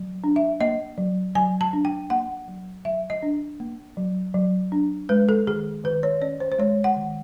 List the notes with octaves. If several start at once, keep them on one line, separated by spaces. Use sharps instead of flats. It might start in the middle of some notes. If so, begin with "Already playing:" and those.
Already playing: F#3
D4
E5
A#3 D#5
F#3
F#3 G#5
A5
D4
G5
A#3 F#5
F#3
F#3 E5
D#5
D4
A#3
F#3
F#3
D4
G#3 B4
A4
D#3 G#4
D#3 B4
C#5
C#4 D5
C5
C5
G#3 C#5
F#5
D#3